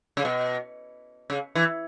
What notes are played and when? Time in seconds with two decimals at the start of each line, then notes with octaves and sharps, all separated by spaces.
0.17 C#3
0.25 B2
1.30 C#3
1.55 E3